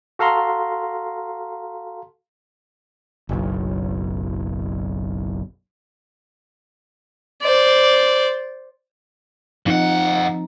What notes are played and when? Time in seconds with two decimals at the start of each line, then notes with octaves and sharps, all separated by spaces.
0.19 F#4 A4 F5 A#5 C6
3.29 F#1 B1
7.42 C5 D5
9.66 F2 F3 C4 D#4 F#5